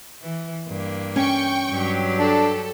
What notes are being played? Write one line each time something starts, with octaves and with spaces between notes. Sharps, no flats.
E3
G2 A#3
C#4 G5 C#6
G2 F#3 G4
D4 A4